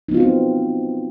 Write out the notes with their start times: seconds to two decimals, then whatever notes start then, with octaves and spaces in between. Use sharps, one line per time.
0.09 D#4
0.11 B3
0.14 F4
0.17 F#4
0.20 C4